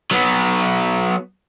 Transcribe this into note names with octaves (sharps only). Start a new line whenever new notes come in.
F#3 B3